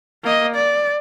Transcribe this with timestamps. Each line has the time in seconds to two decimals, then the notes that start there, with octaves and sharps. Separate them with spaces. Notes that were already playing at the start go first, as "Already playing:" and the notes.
0.24 A#3 D#5
0.55 D5